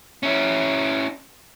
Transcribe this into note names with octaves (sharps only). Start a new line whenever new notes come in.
C#4 E4